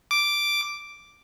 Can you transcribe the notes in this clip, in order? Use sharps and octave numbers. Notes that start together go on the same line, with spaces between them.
D6